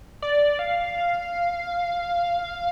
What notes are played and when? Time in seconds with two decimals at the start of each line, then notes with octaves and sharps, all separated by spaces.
0.22 D5
0.59 F5